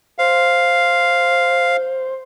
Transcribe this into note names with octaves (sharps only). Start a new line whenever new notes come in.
C5 F5